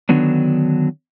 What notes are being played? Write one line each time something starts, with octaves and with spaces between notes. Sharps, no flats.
D3 D#3 F#3 B3 D4